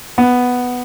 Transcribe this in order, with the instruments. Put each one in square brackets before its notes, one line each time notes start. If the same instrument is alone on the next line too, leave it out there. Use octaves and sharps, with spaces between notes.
[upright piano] B3